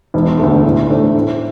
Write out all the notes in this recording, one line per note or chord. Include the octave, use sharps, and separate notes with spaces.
E1
D2 D3 A3
A2
A3 D4 C5
A2